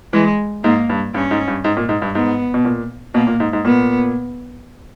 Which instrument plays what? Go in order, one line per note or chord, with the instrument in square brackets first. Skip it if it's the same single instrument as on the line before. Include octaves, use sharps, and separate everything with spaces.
[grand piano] E3 [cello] G#3
[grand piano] G#2 [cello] A#3
[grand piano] G2
[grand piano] G2 [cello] C#4
[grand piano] G#2
G2
G#2
A#2
G#2
G2
[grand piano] G#2 [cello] B3
[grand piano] B2
A#2
[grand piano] B2 [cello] A#3
[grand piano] A#2
G#2
G#2
[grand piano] A#2 [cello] B3